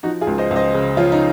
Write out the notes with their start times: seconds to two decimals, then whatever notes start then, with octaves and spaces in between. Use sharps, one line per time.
0.03 F3 D#4 F#4
0.21 F4 G#4
0.27 C#2
0.38 C5 D#5
0.51 C#2
0.56 C5 D#5
0.74 C#3
0.97 F3 C#4 F4
1.12 D#4